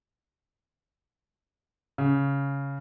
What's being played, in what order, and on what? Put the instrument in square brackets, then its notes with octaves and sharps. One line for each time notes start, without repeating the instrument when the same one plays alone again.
[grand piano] C#3